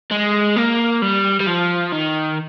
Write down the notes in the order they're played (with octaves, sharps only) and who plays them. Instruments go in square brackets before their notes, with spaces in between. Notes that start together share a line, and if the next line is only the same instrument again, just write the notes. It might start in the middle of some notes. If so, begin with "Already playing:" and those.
[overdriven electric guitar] G#3
A#3
G3
G3
F3
D#3